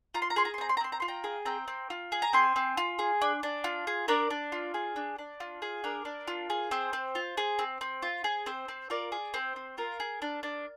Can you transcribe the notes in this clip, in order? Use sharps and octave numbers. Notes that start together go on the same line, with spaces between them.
F4 A#5
C6
A#5
G#4 C6
A#5
C6
C4 A#5
C6
A#5
C4 C6
A#5
F4 C6
G5 A#5
G#4
C4 G5 A#5
C4
F4
G#4
A#5
C4 G#5 C6
C4
F4
G#4
D4
D4
F4
G#4
D4 A#4 D5
D4
F4
G#4
D4
D4
F4
G#4
D4 A#4
D4
F4
G#4
C4 C5
C4
F4
G#4
C4
C4
F4
G#4
C4 C5
C4
F4 A#4 D5
G#4
C4 C5
C4
F4 A#4
G#4
D4
D4